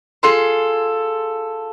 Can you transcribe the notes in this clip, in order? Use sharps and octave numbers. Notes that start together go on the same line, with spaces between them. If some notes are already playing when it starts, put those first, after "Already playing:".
F4 G#4 A4 C6